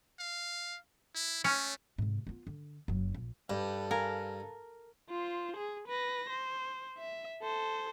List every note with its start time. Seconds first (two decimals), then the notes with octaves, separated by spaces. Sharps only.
0.19 F5
1.15 E4
1.44 A3 C#4
1.98 G#2 C3
2.27 B3 F4
2.47 D3
2.88 F#1 F#3
3.15 A#1
3.50 G2 G4 A4 B4
3.91 A#4 B4 F5 G#5
5.10 F4 C5
5.57 G#4
5.88 B4 A#6
6.30 C5
6.99 E5
7.42 A4 C5